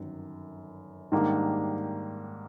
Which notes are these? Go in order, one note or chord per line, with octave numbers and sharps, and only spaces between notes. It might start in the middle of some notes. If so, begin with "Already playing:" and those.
Already playing: G1 F#2 D#3
G#2 D#3 G3 A#3 D4